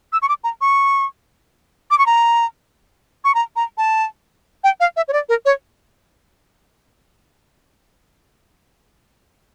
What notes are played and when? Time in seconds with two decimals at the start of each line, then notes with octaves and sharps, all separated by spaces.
0.13 E6
0.22 C#6
0.29 D6
0.44 A#5
0.61 C#6
1.91 D6
1.99 C#6
2.06 A#5
3.24 C#6
3.35 A#5
3.56 A#5
3.78 A5
4.64 G5
4.80 F5
4.96 E5
5.08 C#5
5.13 D5
5.29 A#4
5.45 C#5